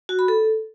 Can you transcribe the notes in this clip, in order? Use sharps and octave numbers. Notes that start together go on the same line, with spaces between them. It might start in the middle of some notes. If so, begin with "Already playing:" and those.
F#4
B5
A4